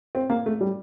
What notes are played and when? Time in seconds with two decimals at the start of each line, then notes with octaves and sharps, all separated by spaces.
0.15 C4
0.30 A#3
0.46 A3
0.61 G3